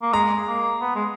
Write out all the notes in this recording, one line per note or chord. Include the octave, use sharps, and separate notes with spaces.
A#3
G#3 A#5
A#3
B3
G#3